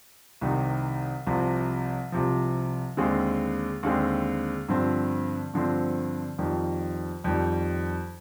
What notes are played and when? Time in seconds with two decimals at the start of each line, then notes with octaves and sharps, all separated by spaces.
0.41 C2 C3 D#3
1.27 C2 C3 F3
2.12 C2 C3 F3
2.97 D#2 D3 G#3 C4
3.83 D#2 D3 G#3 C4
4.68 G2 D3 F3 C4
5.54 G2 D3 F3 C4
6.39 F2 D#3 G3
7.24 F2 D#3 G3